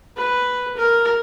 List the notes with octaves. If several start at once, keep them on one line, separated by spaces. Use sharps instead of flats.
B4
A#4